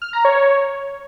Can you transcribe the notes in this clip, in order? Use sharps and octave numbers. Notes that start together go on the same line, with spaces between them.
F6
A#5
C#5